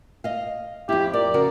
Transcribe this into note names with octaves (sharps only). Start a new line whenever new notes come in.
D#5 F5
F2 E4 G4
A#4 D5
C#3 F#4 A#4